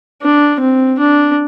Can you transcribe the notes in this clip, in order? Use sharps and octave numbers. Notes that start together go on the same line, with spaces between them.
D4
C4
D4